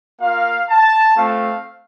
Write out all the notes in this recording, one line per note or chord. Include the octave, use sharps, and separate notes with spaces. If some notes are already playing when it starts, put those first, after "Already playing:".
A#3 F4 F5
A5
A3 C4 F4 F5